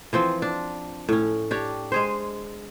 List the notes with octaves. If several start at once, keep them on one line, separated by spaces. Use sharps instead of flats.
E3 F3 C4
D4
A2 C#4
D4 G4 C#5
G#3 G#4 C5